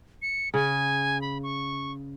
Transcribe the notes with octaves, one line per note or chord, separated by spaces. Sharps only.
C#7
C#3 G#5
B5
C#6